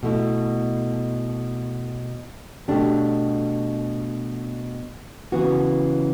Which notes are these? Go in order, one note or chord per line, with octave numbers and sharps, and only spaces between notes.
B2 A3 E4
B2 A3 D4 G4
C#3 E3 B3 F#4